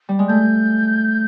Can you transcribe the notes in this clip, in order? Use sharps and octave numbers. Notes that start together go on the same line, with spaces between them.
G3
G#3
A3 G6